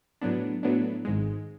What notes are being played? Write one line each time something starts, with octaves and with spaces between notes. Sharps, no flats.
A2 F#3 B3 D4
A2 F#3 B3 D4
G#1 G#2 G#3